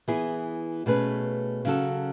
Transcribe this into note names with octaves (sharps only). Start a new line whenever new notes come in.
E3 B3 E4 G#4
B2 A3 C#4 G#4 B4
C#3 F#3 C#4 F#4 A4